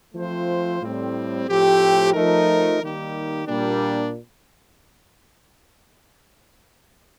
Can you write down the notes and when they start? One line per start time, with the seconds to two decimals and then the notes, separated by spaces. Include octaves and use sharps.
0.14 F3 A3 C4 F4 C5
0.80 A2 G3 C4
1.47 A2 F3 A3 C4 G4
2.13 F3 A3 D#4 A#4
2.80 D#3 G3 A#3 D#4 G4
3.47 A#2 G3 A#3 D4